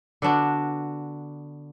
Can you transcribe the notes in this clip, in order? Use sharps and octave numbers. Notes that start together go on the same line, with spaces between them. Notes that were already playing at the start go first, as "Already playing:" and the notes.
D3 B3 D4 F#4